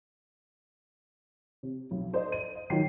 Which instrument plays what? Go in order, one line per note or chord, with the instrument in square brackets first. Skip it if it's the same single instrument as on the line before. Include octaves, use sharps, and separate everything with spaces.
[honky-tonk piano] C3
B1
A4 C5 D5 D#5
D#7
D#5
D#3 F3 F#3 G5 C7